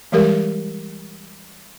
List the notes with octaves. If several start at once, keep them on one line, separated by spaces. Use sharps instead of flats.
E3 G3 G#3 G4 A#4